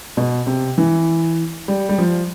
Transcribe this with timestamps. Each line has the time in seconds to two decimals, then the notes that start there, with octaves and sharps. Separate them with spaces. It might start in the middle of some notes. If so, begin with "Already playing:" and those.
0.17 B2
0.47 C3
0.78 E3
1.68 G3
1.89 G3
1.98 F3